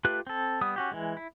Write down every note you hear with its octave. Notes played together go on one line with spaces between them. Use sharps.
A3 F4 G4 B4 F#6
C4 A4
G3 B3 D#6
C#4 F#4 G4
E3 G#3
E4